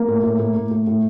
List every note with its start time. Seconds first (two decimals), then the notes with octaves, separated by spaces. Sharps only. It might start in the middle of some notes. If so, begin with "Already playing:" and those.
Already playing: A#3
0.08 A2
0.23 A2
0.39 A2
0.56 A2
0.71 A2
0.87 A2